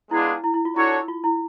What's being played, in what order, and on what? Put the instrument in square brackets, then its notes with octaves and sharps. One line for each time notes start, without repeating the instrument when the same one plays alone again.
[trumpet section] G#3 B3 D4 F4 G#4 [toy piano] E4
[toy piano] E4
E4
F4
[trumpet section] D4 F#4 A4 C#5 [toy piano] E4
[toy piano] F4
E4